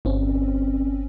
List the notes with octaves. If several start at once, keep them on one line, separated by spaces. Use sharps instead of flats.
G1 C4 C#4